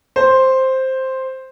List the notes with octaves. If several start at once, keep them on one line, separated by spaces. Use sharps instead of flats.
C5